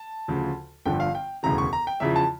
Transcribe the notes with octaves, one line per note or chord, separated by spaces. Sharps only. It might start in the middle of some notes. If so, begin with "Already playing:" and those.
Already playing: A5
D2 C#3 F3
G1 G2 D3 F3 G5
F5
G5
E1 D2 C#3 E3 A#5
C#6
A#5
G5
E2 C#3 F3 E5
A5